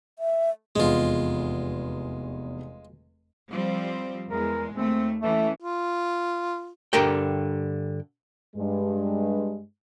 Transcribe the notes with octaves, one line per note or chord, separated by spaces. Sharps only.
E5
F1 E2 G#3 F4
F3 G3 C4
E2 G#3 A#4
D#2 A3 C4
E3 A3 C#4
F4
G2 D3 G4 A#4 G5
G2 G#3